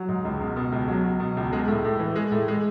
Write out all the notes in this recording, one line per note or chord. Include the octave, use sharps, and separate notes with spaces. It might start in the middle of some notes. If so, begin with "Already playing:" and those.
Already playing: F#3
G#2
C#2
B2
B2
C#2
F#3
F#3
B2
C#2
G#3
A2
A2
E3
G#3
A2
G#3